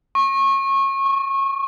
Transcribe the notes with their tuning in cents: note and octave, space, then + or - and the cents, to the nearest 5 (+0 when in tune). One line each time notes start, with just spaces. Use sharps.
C#6 -25
C#6 +15